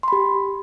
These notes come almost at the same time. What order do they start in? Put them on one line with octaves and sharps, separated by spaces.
C6 B5 G4